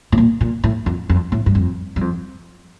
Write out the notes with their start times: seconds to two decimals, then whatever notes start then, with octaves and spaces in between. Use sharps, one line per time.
0.12 A2
0.18 A#2
0.41 A#2
0.64 A2
0.86 F2
1.09 F2
1.32 A2
1.46 G2
1.55 F2
1.96 G2
2.01 F2